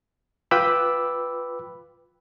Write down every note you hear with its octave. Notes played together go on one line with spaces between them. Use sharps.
F4 B4 G5 B5 D6 E6